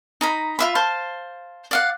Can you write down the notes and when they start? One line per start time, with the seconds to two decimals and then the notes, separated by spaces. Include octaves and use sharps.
0.21 D#4 A#5 B5
0.59 F4 E5 B5
0.75 C5 F5 A5
1.71 D5 F5 F#5